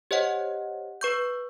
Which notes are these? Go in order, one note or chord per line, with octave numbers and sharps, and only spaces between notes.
G4 C5 C#5 D#5 F#5
B4 C#6 G6